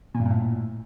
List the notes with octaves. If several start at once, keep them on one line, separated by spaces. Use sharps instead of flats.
A#2
G2
A#2
A2